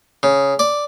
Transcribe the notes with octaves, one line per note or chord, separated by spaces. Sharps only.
C#3
D5